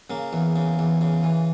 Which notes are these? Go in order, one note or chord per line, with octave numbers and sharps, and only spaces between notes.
C#3 A#3
E2
C#3
E2
C#3
E3